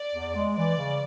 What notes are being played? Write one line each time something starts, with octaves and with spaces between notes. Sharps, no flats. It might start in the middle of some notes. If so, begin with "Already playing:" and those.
Already playing: D5
E2
G#3
E3 D5
C#3